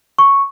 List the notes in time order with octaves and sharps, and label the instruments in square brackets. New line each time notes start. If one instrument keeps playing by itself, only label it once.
[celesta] C#6